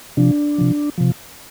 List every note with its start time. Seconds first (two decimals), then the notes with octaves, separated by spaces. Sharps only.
0.17 C3 F3 D4
0.58 C3 F3
0.98 C3 F3